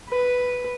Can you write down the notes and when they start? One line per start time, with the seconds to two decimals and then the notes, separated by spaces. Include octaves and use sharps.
0.09 B4